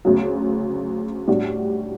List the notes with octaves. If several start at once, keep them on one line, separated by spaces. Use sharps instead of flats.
D2 C#3 F#3
A2 G3 D4 F#4